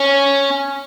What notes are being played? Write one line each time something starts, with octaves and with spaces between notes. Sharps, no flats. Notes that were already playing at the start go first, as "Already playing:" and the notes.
Already playing: C#4